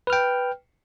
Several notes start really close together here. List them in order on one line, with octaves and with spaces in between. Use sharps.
B4 F6 G5